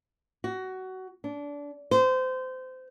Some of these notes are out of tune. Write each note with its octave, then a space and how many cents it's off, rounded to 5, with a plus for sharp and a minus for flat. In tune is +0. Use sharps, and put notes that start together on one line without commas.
F#4 +20
D4 -25
C5 -25